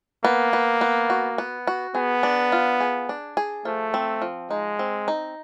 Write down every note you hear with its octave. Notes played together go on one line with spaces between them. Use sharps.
A#3 B3
B3
B3
F#4
B3
F#4
B3 G#4
D4
F4
G#4
D4
G#4
F3 A3
C4
F3
G#3 D#4
C4
D#4